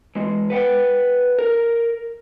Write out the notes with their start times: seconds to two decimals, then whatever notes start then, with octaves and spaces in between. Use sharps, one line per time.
0.15 E3 G#3
0.50 B4 F#5 G5
1.39 A#4